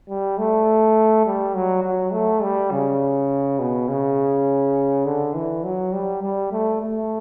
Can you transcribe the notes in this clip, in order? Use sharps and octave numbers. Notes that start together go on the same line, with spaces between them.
G3
A3
G3
F#3
F#3
A3
G3
C#3
B2
C#3
D3
E3
F#3
G3
G3
A3
A3